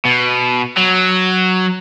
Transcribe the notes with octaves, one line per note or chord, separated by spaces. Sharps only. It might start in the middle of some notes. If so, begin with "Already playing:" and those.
B2
F#3